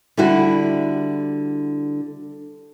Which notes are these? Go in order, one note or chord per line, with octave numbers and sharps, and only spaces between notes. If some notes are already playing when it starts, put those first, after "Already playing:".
D3 G3 E4 F#4